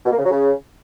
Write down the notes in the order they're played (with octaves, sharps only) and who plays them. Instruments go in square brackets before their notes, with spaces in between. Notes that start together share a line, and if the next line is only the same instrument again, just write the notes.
[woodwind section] B2
A#3
C#3
F#3
C#3